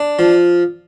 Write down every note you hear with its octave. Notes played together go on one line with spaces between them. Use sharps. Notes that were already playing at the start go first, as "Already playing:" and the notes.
Already playing: D4
F3